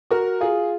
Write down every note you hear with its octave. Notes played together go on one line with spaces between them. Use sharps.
F#4 A#4
F4 G#4